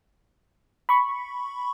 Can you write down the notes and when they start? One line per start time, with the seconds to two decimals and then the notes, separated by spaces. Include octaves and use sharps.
0.89 B5 C#6